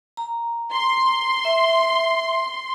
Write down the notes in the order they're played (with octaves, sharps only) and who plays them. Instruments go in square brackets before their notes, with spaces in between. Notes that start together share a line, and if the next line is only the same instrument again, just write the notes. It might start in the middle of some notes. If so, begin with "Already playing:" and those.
[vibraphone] A#5
[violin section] C6
[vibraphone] E5